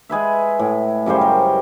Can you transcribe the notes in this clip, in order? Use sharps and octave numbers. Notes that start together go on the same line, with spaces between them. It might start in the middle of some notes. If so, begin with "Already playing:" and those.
G#3 G#4 B4 E5
A2
F#2 C#3 G3 C5
A#4